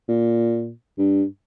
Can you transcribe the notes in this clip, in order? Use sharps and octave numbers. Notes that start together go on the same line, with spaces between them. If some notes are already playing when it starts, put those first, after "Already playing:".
A#2
G2